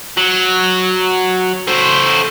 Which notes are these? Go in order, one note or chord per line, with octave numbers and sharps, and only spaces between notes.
F#3
A3 C5